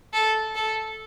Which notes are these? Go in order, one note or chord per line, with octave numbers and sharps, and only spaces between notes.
A4
A4